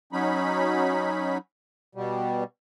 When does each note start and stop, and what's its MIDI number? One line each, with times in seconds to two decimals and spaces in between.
0.13 1.38 54
0.13 1.38 61
0.13 1.38 63
0.13 1.38 83
1.95 2.44 47
1.95 2.44 55